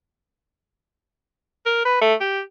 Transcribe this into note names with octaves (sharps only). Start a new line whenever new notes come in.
A#4
B4
A3
G4